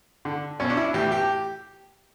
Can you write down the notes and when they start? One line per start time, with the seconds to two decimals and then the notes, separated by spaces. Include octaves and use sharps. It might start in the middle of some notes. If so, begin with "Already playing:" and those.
0.25 D3
0.60 B1 C#4
0.70 D4
0.77 E4
0.94 A2 E3 G4
1.12 G4